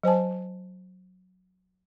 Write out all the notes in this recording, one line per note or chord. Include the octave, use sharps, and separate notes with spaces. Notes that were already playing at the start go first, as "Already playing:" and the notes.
F#3 C5 G#5 A5